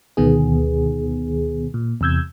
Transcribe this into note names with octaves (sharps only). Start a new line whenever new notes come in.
D2 B2 D#3 B3 G#4
A#2
E2 C3 E6 G6 G#6